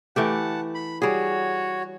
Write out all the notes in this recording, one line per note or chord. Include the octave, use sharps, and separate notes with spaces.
E3 A3 G4 F#5 A5
B5
G3 F#4 G#4 C#5